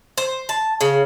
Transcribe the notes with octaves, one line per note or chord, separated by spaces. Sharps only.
C5
A5
C#3